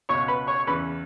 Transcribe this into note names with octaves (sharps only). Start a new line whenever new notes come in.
C#2 B2 C#5 C#6
B4 B5
C#5 C#6
C#6
E2 C#3 E3 B4 B5